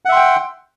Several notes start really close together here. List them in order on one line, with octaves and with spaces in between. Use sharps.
F#5 E5 C6 G5